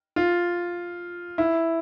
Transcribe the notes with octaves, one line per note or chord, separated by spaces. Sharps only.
F4
E4